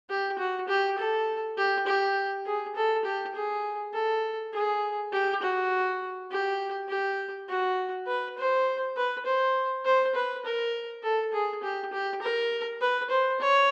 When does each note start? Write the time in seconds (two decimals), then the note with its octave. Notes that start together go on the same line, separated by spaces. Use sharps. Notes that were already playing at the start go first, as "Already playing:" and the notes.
0.10 G4
0.39 F#4
0.68 G4
0.98 A4
1.57 G4
1.87 G4
2.46 G#4
2.76 A4
3.05 G4
3.35 G#4
3.93 A4
4.53 G#4
5.13 G4
5.42 F#4
6.31 G4
6.89 G4
7.49 F#4
8.07 B4
8.38 C5
8.97 B4
9.26 C5
9.85 C5
10.15 B4
10.45 A#4
11.03 A4
11.33 G#4
11.63 G4
11.93 G4
12.22 A#4
12.81 B4
13.10 C5
13.40 C#5